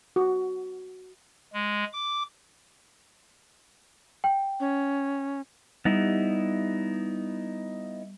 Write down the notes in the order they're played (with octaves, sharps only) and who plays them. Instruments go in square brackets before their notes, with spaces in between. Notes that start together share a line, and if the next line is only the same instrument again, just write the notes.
[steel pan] F#4
[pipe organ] G#3
D6
[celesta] G5
[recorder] C#4
[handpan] G3 [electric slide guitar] B3 D#4 E4